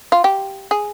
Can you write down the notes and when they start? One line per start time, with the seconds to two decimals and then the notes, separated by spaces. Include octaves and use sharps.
0.12 F4
0.24 G4
0.71 G#4